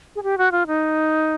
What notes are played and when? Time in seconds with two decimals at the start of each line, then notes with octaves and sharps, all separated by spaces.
0.16 G#4
0.23 G4
0.38 F#4
0.52 F4
0.67 D#4